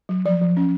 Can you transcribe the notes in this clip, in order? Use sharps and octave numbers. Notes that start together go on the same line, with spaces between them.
F#3
F3 D5
F3
C#4